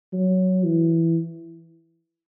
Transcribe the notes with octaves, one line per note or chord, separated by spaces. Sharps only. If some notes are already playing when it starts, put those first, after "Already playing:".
F#3
E3